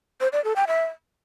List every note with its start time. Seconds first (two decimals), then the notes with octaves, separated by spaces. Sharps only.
0.21 C5
0.33 D5
0.44 A4
0.56 G5
0.68 E5